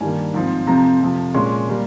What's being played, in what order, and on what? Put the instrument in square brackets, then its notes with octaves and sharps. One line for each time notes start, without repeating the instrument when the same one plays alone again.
[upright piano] G2 D#3 G3 A#3 G#5
G#2 F3 C4
F2 C3 F3 C4 A#5
F2 C3 F3
A#2 G#3 C#4 C6
G3 A#3